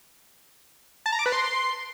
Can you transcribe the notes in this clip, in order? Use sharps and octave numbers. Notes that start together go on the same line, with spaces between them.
A5
A#5
D6
B4
C6